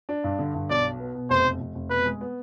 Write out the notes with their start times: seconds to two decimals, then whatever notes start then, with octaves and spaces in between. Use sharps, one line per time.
0.09 D4
0.24 G2
0.39 D3
0.54 G2
0.70 B1 D5
0.84 B2
1.00 B3
1.15 B2
1.30 F1 C5
1.45 F1
1.61 F1
1.75 F1
1.90 B2 B4
2.05 G#3
2.21 B3